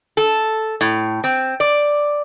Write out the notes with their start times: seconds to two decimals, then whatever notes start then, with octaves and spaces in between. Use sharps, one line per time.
0.17 A4
0.81 A2
1.24 C4
1.60 D5